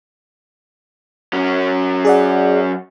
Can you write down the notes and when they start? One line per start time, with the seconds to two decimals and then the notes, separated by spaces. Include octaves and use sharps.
1.33 F#3 C#4
2.05 G#4 D5 F#5